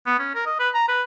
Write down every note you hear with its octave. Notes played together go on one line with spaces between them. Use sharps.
B3
C#4
A#4
D#5
B4
A#5
B4